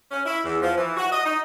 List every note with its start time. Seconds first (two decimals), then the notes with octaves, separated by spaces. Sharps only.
0.11 C#4
0.25 E4
0.44 E2
0.62 F3
0.77 E3
0.97 F#4
1.11 D#5
1.24 D#4